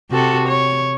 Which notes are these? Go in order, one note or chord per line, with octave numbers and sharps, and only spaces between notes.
C3 F#4 A4
C#5